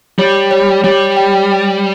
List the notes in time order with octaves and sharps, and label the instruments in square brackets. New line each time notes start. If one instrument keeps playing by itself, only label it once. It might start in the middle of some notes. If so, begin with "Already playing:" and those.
[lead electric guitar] G3 [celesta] C#5
[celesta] C#5
[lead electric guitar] G3 [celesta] C#5
[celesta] G5